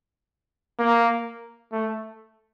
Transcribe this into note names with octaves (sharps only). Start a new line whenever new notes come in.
A#3
A3